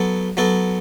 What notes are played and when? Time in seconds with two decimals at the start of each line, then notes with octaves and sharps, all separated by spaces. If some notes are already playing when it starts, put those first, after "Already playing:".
Already playing: F#3 B3 F#4 A4
0.37 F#3 B3 F#4 A4